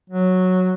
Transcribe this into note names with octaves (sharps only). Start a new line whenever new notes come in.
F#3